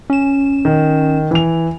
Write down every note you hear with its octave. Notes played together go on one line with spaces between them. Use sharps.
C#4 E7
D#3
E3 F7